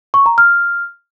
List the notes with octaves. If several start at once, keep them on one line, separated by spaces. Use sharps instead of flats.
C#6
A#5
F6